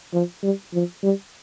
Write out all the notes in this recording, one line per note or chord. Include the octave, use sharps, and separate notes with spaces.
F3
G3
F3
G3